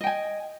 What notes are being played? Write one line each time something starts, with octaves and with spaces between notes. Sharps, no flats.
D#5 G5 G#5